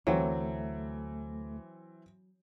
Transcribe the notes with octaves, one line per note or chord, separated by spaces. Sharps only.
D2 E3 F#3 A3 C4